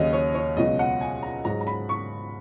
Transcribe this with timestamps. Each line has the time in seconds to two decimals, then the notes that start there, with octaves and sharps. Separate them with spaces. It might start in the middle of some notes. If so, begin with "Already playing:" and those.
Already playing: D#2 C#3 F#3 C#5 D#5
0.13 C#5
0.34 C#5
0.57 C#2 B2 F#3 D#5
0.79 F#5
1.01 G#5
1.23 A#5
1.45 G#2 F#3 A#5
1.61 A#5
1.67 B5
1.89 C#6